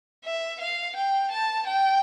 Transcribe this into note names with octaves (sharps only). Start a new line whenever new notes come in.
E5
F5
G5
A5
G5